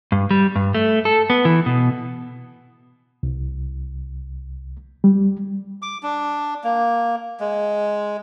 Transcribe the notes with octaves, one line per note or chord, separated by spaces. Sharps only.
G2
G3
G2
A3
A4
B3
E3
B2
C2
G3
D6
D4
A#3
G#3